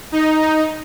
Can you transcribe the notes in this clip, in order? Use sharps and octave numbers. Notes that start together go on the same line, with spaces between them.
D#4